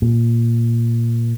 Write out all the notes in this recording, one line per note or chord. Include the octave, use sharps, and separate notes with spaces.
A#2